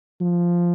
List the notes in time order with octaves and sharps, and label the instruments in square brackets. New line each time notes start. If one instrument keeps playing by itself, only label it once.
[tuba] F3